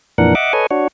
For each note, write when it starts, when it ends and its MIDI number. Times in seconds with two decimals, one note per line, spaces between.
0.18 0.35 41
0.18 0.35 46
0.18 0.35 52
0.18 0.35 62
0.18 0.35 70
0.18 0.35 78
0.35 0.53 75
0.35 0.53 76
0.35 0.53 78
0.35 0.53 86
0.53 0.67 69
0.53 0.67 71
0.53 0.67 73
0.53 0.67 75
0.53 0.67 80
0.71 0.88 62
0.71 0.88 66
0.71 0.88 73